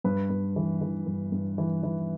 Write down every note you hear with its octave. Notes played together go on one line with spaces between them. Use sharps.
G2 B4
G2
E3
E3
G2
G2
E3
E3